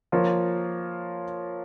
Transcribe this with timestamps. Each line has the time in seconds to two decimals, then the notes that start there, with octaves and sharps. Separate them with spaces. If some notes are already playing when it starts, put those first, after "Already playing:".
0.12 F3 A#3 F4 A#4 C#5